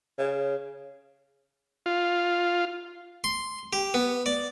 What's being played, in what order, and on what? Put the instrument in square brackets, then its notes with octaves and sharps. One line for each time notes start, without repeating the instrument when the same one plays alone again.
[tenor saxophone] C#3
[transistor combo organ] F4
[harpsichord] C6
G4
B3
D5